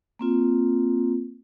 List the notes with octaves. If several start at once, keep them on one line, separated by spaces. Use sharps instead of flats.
A#3 C4 F4